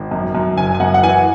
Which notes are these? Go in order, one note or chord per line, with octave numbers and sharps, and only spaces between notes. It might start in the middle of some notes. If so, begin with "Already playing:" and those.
Already playing: G#1
F#2
F#2
F#1 G#5
G#5
F#2 F#5
F#5
E3 G#5